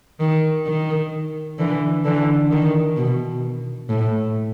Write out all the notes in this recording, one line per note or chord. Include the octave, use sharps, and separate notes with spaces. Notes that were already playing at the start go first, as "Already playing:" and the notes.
D#3
D#3
D3 E3
D3 E3
D#3
B2
A2